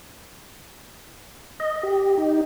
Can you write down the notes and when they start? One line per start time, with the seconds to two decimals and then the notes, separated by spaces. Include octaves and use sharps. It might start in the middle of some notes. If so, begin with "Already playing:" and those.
1.60 D#5
1.83 G4
2.18 D#4